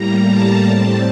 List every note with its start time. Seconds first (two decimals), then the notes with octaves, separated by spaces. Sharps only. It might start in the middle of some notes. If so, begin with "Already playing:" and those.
Already playing: A2 G3 A#3 A#5
0.27 A5
0.64 A2 G3 C4